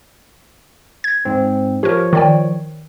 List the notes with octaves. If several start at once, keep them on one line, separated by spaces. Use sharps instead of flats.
G#6
G#2 C4
F3 G4 A#4 C#5
D#3 D5 G5